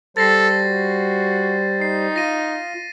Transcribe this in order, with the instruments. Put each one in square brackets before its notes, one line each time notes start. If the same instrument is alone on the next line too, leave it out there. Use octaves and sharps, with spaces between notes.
[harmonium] G3 C5 [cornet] A4 [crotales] A6 A#6 C7
[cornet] F#4
[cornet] D#4 [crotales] C7
[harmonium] F4 [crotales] A#6 D#7